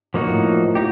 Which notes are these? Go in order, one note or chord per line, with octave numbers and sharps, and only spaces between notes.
A#2 F3 A#3 D#4 F#4
A2
A#2
D#4 G4